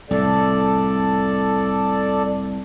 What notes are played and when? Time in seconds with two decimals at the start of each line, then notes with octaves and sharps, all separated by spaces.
0.11 C2 A2 A4 D5